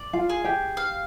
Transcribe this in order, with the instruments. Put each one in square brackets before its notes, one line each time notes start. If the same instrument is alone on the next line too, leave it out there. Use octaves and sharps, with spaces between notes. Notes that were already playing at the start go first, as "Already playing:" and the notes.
Already playing: [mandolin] D5
[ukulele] F4 F5
[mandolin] G#4
[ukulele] G4 G5
[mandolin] F5